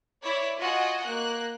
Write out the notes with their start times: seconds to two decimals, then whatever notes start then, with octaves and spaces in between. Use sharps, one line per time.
0.21 E4 C#5 D5
0.58 F4 F#4 D#5 F#5 G#5
1.03 A#3 F#6